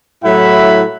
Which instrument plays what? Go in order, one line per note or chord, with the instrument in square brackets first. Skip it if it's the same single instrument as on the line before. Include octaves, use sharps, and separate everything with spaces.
[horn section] A2 F#3 E4 E5 F#5 B5